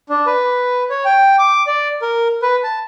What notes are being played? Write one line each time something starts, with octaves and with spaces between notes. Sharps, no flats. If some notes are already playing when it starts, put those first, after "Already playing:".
D4
B4
C#5
G5
D6
D5
A#4
B4
A5